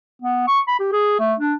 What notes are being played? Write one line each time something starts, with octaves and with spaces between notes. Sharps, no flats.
B3
C#6
B5
G4
G#4
A3
D4